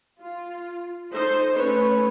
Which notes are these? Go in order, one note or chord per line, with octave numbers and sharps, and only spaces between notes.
F4
D#4 A4 C5
A3 C#4 B4 C#5